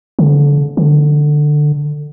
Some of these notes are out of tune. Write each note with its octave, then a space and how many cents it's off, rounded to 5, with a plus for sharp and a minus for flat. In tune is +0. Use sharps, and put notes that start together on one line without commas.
D3 -30
D3 +15